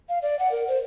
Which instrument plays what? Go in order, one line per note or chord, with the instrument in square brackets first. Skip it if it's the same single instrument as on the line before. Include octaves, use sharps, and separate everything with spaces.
[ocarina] F5
D5
F#5
A#4
C5